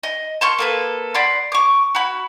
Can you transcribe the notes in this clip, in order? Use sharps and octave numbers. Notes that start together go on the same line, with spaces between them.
D#5
A5 C6 C#6 F6
A#3 A4 B4
D5 F#5 B5 C6
C#6 D6
F#4 B5